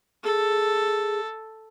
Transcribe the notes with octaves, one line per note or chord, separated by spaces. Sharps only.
G#4 A4